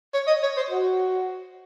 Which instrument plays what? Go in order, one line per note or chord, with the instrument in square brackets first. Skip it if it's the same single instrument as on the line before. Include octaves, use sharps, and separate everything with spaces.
[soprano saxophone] C#5
D#5
C#5
C5
F#4